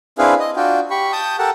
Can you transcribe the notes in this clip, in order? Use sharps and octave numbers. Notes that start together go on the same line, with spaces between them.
C4 D4 E4 G#4 B4 F5
D#5
D4 F4 F#4 G5
G4 B5 C#6
G5 A5 D#6 G6
G4 A4 A#4 F#5 G5 A5